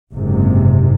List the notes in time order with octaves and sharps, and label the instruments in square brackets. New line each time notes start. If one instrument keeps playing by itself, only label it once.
[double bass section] F#1 G#2 C3